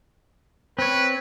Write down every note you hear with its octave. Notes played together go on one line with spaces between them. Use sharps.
C4 B4 C#5